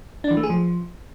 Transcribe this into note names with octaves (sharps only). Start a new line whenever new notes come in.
D4
E3
A3
G#4
F3